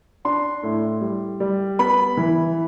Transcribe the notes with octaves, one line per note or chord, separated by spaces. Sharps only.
D4 C6
A2
G3
G3
B3 B5
E3